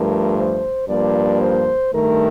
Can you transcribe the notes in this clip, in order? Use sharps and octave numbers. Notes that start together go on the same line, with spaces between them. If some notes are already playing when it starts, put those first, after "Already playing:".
Already playing: G2 F3 A3 A#4
C5
G2 F3 A#3 D5
C5
G2 D#3 A3 A#4